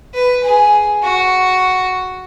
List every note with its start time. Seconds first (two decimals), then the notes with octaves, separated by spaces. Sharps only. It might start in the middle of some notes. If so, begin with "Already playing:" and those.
0.14 B4
0.44 G#4
1.02 F#4